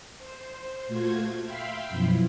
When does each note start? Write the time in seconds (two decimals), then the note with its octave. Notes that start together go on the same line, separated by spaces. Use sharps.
0.18 C5
0.87 A#2 A3 F4 F#4 C5 G#6
1.41 E5 F5 G5 B5 C6
1.89 F#2 B2 F3 E4